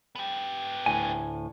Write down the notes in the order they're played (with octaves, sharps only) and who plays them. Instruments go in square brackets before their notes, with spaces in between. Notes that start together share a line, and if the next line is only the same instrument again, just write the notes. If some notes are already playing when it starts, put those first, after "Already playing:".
[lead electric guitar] B3 G4
[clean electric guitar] D2 A2 G#5